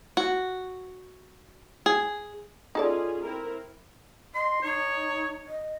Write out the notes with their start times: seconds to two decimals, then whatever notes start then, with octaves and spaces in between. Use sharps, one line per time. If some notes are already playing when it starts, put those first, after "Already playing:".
0.17 F#4
1.86 G#4
2.75 C#4 D#4 F4 G#4 A4 D5
3.24 C4 E4 A#4
4.35 D#5 C6
4.62 D#4 C#5
5.47 D#5